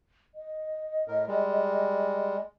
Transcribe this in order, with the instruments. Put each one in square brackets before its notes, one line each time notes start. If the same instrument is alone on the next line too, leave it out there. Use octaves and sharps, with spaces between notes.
[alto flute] D#5
[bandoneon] A2 A#4
G3 G#3